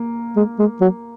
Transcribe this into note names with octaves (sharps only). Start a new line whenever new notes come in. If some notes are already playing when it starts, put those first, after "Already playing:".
Already playing: A#3
G#3
G#3
F#3